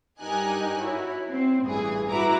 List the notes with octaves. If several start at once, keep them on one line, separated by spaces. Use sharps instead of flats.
G2 D#4 G4 A#4 G#5 F#6
E4 F#4 C#5
C4
A1 G2 E3 G#4
E4 F#4 B4 A#5 D6